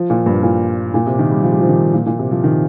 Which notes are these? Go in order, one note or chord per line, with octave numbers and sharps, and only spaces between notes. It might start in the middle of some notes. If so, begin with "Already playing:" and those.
Already playing: F3
A#2
G2
A#2
A#2
C3
D#3
G3
F3
G3
F3
D#3
A#2
A#2
C3
F3
D#3